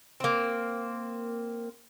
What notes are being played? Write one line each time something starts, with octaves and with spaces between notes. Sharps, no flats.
A#3 C4